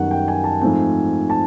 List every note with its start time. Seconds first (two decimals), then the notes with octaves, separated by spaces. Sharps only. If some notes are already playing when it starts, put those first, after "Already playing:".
Already playing: F#2 D#3 G3 B3 F#5
0.11 G5
0.28 G#5
0.44 A5
0.61 G#2 F3 A3 C4 G#5
1.30 A5